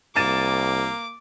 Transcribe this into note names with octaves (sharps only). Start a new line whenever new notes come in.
C2 A#3 D6 A6 D#7 E7